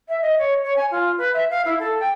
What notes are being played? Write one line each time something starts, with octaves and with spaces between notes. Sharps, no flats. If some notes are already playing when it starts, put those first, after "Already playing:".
E5
D#5
C#5
C#5
G#5
F4
B4
E5
F5
E4
A4
G5